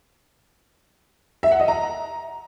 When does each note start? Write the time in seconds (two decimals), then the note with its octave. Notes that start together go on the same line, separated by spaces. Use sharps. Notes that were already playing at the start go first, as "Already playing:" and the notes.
1.43 E5
1.51 F#5
1.60 D#5
1.68 A#5